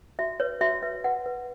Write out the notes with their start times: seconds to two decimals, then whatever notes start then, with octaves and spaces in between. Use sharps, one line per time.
0.19 F#4 E5
0.40 B4 C#5
0.61 F#4 E5
0.82 B4 E5
1.04 B4 F#5
1.26 B4